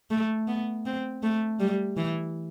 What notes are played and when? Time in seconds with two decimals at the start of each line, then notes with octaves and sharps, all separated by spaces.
0.11 A3
0.48 B3
0.86 C4
1.23 A3
1.60 G3
1.97 E3